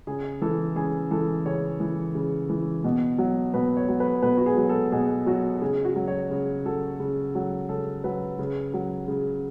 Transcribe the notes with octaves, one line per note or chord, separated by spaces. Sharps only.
C#3 G#4
E3 A4
C#3 G#4
E3 A4
C#3 C#5
E3
C#3
E3
B2
F#3
B2 B4
C#5
F#3
B4
B2 B4
F#4
G#4
F#3
A4
B2 G#4
F#3 F#4
C#3 G#4
F#4
F#3
C#5
C#3
F#3 A4
C#3
F#3
C#3 A4
F#3 B4
C#3
F#3
C#3